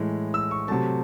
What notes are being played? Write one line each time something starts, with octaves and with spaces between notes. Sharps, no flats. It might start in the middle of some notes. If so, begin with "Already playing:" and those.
Already playing: A2 E3 G#3
E6
C#6
C3 F#3 A3 A5